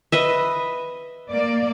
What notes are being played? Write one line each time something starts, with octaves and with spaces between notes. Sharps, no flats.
B4 D#5 E5
A#3 D5